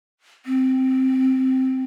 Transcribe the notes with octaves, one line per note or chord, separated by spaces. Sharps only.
C4